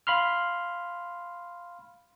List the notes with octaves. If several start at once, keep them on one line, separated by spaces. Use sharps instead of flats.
F5 B5 C6 F6